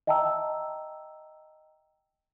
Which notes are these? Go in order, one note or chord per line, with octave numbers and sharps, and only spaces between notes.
D#5 E5 G5 A5 A#5 E6